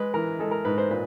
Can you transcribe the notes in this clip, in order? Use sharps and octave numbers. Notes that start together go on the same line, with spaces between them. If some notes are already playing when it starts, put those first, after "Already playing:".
Already playing: G#3 B4
E3 A#4
G#3 A4
A#4
G#2 B4
C5
A#2 B4